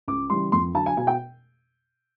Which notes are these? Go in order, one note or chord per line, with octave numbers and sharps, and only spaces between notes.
C#2 D6
C#3 E3 G3 C6
F2 C6
D3 F#3 A5
G#5
B2 G#5
G5